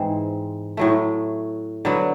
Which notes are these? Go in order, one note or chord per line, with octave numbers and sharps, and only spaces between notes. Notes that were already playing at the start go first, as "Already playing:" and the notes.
Already playing: G#2 E3 G#3 C4
A2 F#3 A3
D3 F#3 B3